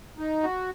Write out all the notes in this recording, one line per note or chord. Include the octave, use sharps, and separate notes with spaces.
D#4
F#4